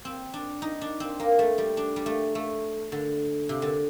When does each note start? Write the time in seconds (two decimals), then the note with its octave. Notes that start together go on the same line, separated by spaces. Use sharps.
0.05 C4
0.34 D4
0.62 D#4
0.81 D4
1.00 C4
1.20 A#3
1.39 A3
1.58 G3
1.77 D4
1.96 G3
2.06 A3
2.35 A3
2.92 D3
3.49 C3
3.62 D3